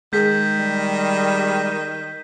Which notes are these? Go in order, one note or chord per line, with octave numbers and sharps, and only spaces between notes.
D#3 G#3 G#4 G6 B6
G3